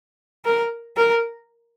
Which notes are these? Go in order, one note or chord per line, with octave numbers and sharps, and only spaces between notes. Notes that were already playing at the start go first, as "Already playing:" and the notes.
A#4
A#4